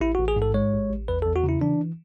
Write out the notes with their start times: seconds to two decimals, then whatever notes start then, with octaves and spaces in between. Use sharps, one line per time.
0.01 A1 E4
0.15 A1 F#4
0.28 G#4
0.36 G#2
0.42 A4
0.54 G#3 C#5
0.73 A1
0.90 A1
1.08 E2 B4
1.22 E2 A4
1.36 F#4
1.44 C#3
1.49 E4
1.61 E3 D4